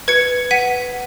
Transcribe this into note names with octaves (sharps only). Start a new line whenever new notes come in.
B4 G#6 C#7
F#5 B6 D#7